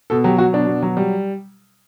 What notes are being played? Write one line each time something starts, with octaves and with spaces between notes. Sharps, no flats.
B2 A4
F#3 G4
F#3 F#4
B2 D4
B2
F#3
G3